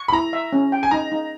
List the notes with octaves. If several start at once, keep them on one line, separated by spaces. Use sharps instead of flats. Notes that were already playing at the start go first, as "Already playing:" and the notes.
Already playing: C#6
B5
E4 A#5
E5
C#4
G5
G#5
D#4 A#5
D#4